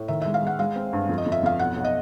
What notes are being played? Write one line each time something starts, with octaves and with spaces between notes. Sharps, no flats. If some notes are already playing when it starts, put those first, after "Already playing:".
Already playing: A2
D#3 E5
G#3 E5
F5
G#3 F#5
G#3 F5
C4
G2
F2
D#5
F2
E5
F2 F5
B1 F#5
B1
D#5